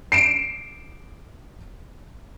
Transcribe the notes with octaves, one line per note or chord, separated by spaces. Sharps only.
C7 D7 E7